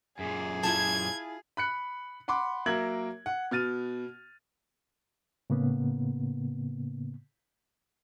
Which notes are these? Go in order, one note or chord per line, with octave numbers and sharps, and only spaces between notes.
F#2 A#2 G#4
E4 F4 A5 G#6
B5 F#6 C#7
F#5 B5 C6 D6
F#3 A#3 A#4 E5 G#6 F#7
F#5
B2 F6 A6 D#7
A2 C#3 A#3 B3